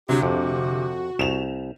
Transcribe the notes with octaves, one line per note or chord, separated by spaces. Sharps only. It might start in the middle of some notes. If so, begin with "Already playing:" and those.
D2 C3 F#3 G4
F2 F#4
C2 E7 F7